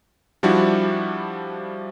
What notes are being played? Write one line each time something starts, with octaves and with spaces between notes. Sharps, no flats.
F3 G3 D4 E4 F#4